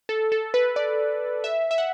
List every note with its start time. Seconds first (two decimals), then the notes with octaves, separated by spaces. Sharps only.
0.09 A4
0.32 A4
0.54 B4
0.76 D5
1.44 E5
1.71 E5
1.78 F#5